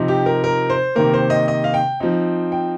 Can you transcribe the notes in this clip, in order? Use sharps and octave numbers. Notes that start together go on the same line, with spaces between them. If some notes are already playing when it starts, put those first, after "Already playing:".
Already playing: C3 F3 C4 D#4
G4
A#4
A#4
C5
C3 D#3 A#3 A#4
C5
D#5
D#5
F5
G5
F3 C4 D#4
G5